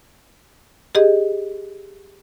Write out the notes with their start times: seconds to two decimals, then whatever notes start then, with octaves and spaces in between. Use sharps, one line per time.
0.95 G4 G#4 D#5